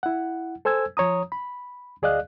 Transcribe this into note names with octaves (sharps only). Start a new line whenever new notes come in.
E4 F#5
A4 C5 G#5 E6 G#6
F3 C#5 A#5 D#6
B5
D2 G#4 D5 D#5 F5 F#6